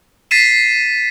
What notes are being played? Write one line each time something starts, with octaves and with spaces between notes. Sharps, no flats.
A6 B6 C7 D#7 E7